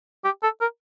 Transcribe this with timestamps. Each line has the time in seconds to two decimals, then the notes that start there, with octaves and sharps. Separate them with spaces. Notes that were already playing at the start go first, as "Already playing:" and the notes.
0.24 G4
0.43 A4
0.61 A#4